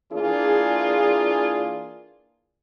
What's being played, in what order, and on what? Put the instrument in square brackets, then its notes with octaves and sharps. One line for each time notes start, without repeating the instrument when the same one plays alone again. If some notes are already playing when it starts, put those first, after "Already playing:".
[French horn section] E3 A#3 D4 F4 G#4